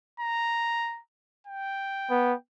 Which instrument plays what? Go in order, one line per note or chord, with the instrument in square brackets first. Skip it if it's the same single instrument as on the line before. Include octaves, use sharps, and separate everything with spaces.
[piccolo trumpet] A#5
G5
[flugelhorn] B3